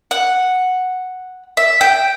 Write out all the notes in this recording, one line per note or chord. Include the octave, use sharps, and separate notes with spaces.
F#5
E5
G5